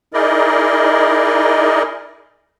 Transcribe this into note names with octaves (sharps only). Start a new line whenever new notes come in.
D#4 E4 G#4 A#4 D5 D#5